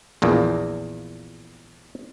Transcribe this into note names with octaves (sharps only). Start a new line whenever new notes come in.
A#1 E2 A#2